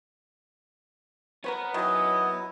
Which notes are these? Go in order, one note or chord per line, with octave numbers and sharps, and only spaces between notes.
B3 A#4 B4 C#5
D#3 F#3 C#4 E4 D#5